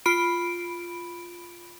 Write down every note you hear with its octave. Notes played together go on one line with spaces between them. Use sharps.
F4 B5 D7